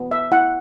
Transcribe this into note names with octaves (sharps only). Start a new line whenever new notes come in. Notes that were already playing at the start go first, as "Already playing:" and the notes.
Already playing: B3
E5
E4 F#5